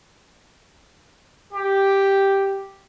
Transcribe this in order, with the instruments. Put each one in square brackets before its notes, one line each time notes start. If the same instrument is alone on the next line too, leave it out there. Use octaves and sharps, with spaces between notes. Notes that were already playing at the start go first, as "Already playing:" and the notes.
[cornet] G4